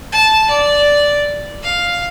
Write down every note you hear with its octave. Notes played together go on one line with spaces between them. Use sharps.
A5
D5
F5